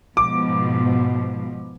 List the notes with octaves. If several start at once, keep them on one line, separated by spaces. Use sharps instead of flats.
G#2 B2 F3 D6